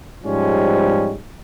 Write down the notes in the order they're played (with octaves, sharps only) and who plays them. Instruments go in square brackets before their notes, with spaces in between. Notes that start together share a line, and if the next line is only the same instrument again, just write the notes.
[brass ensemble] G#2 F3 G3 G#3 C#4